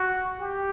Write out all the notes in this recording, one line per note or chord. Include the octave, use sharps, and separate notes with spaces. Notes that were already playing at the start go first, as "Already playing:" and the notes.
Already playing: F#4
G4